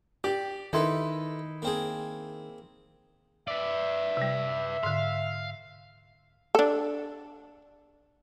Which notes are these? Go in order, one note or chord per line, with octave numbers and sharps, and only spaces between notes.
G4 D5
D#3 D#4 E4 A4 B4 C6
A#3 C4 G#4
B4 D5 E5
C3 G3
G#2 D3 F5
D4 A4